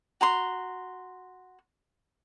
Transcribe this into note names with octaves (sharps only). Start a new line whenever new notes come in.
F#4 A#5 C6